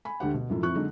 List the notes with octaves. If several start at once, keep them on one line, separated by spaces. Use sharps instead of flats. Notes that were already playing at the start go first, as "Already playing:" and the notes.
G#5 B5
D2 D3 G4 F#5
B2
F#2 A2 F3
F2 F3 C4 E4 C#6 F#6
D3 F#3 G#3 D#4